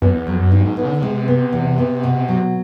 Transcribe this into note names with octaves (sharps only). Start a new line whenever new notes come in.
F#2 B3
E2
F2 F#3
F#2
G2 D#4
G#2
A2 B3
C#3
D3
C3 G#3
B3
E2
B3
B2
F#3